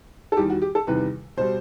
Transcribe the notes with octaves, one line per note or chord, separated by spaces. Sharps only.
A4
E2 D#3 G3 G4
F#4
G4
A4
E2 C3 D#3 G3 B4
B2 G3 C5